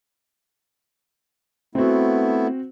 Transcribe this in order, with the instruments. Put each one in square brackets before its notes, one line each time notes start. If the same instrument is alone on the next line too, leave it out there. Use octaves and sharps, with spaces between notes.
[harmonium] A3 B3 E4 [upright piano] C4 F#4